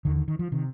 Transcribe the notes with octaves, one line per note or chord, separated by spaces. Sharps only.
D#2 D3 D#3
D#3
D#3
F3
C3 D#3